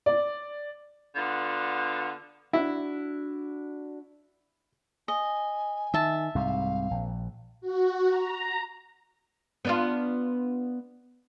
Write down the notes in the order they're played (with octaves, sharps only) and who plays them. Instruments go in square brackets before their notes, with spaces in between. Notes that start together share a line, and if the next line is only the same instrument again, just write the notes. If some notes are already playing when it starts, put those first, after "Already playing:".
[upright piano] D5
[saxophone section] D3 B3 F4
[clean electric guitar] D4 F#4 [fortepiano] E4
[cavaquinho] D#5 [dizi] G#5
[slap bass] D#3 [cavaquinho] E5 A5
[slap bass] C2 G#2 C3 [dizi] F5
[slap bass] A#1
[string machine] F#4
A#5
[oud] B3 D4 F4